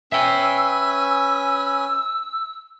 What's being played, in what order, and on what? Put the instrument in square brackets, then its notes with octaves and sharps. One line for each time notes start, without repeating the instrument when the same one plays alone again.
[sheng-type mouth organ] C#4 B4 G#5 [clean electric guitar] E5 G5 [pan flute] E6